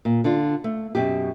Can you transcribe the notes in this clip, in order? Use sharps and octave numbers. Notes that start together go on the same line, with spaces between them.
A#2
D3 D4 F4
A3
F#2 B2 G4